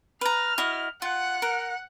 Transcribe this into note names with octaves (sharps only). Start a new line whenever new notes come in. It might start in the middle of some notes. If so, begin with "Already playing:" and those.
B4 A#5 F6
E4 F#4 D#5
F4 F#5
A#4